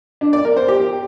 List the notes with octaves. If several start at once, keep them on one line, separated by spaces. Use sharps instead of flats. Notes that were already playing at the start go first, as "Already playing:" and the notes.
D4
D5
A#4
C5
G4